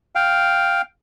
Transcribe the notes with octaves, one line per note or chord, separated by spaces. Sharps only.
F5 G5